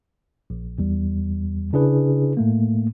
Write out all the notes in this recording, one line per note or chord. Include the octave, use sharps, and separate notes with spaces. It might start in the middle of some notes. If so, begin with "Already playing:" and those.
A#1
E2 G3
C#3 D4 E4 G#4 B4
A2 A3 A#3